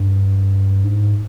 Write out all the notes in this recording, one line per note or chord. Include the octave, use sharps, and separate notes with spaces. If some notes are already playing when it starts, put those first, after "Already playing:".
Already playing: G2
G#2